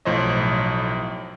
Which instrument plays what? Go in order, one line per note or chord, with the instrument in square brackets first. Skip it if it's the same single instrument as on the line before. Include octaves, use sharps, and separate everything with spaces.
[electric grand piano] B1 A2 F3 C5 C#5 D#5